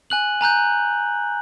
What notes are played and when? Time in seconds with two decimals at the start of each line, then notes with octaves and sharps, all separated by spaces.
0.10 G#5 F#6 F#7
0.41 G#5 A#5 F#6 G6